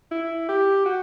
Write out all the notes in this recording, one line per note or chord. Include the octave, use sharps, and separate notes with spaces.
E4
G4
F#4